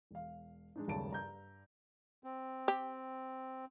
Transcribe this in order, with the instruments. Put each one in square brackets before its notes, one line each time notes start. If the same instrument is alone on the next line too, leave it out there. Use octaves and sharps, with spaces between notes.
[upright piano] E1 F5
G#3 D4 D#4
D#1 G#1 F#2 C#3 A5 D7
G2 A#5 G6
[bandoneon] C4
[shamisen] G4